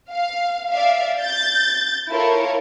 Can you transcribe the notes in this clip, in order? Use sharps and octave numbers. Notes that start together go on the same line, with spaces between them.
F5
D5 E5 F5
G6 A6
E4 F4 A4 A#4 C#5